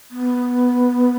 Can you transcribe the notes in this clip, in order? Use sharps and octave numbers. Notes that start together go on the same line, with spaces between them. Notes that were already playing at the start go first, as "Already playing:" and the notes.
B3